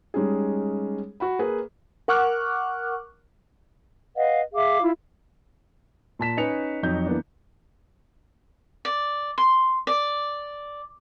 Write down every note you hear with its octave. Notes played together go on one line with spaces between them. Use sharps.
G3 G#3 C#4 D#4 G#4
F#4 F#5 B5
A#3 G#4 B4
A#4 F#5 C#6 D6 F6 F#6
B4 D#5 F5 F#5
G#4 E5 F5 D6
E4 F4
A#2 A5 B6 E7
C#4 D#4 B4 G#5 C#7 F7
F2 F#3 D#4 G6
E3 A#3 B3 D4
D5
C6
D5